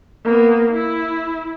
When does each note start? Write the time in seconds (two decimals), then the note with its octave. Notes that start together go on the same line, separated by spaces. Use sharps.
0.24 A#3 B3
0.72 E4